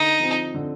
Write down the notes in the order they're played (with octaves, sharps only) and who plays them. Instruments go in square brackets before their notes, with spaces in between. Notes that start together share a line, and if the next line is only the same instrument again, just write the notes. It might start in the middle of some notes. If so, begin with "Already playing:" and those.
Already playing: [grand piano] D3 [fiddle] D#4
[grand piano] F3 C4
D3